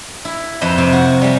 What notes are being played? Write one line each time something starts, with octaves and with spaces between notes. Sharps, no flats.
E4
F2 E4 B4 C5 D#5
C3
F#4 A#4
G3 G#3